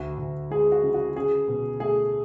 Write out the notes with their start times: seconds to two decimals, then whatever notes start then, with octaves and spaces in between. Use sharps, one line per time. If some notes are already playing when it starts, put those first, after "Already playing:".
Already playing: D2 F#4
0.18 D2
0.50 G#3 G#4
0.72 F#4
0.83 C#3
0.94 F#4
1.16 C#4 G#4
1.48 B2
1.80 A3 G#4